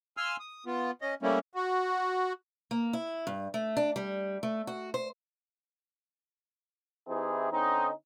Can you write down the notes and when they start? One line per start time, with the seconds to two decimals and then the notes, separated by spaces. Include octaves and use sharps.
0.17 F5 G#5 C6 E6 F6
0.40 D#6
0.66 B3 F4
1.02 C#4 D#5
1.22 G3 A3 A#3 C#4 E4
1.55 F#4
2.71 A#3
2.93 E4
3.27 G2
3.54 A3
3.77 D4
3.96 G3
4.43 A3
4.67 F#4
4.94 C5
7.08 E3 C4 D#4 E4 G4 G#4
7.51 D3 C4 C#4 D#4